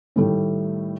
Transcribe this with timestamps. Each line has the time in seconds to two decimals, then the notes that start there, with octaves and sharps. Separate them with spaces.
0.16 A2 D#3 G3 A3